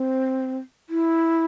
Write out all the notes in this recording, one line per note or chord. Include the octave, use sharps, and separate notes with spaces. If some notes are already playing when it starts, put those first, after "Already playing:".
Already playing: C4
E4